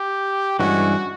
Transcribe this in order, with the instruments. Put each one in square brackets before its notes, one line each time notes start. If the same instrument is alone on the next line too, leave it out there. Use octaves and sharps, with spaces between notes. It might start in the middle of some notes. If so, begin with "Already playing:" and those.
Already playing: [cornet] G4
[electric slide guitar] G2 E3 G#3 C#4 [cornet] F#4